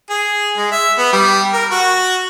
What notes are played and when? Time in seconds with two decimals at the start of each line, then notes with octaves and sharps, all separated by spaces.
0.10 G#4
0.57 G#3
0.72 E5
0.98 B3
1.13 G3
1.53 A#4
1.71 F#4